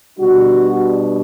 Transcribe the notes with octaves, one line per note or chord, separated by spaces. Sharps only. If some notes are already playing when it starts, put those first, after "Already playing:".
B2 G3 D4 F#4